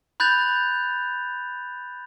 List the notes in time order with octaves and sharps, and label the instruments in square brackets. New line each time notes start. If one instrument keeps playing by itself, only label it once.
[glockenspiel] B5 F#6 G6 A6 F7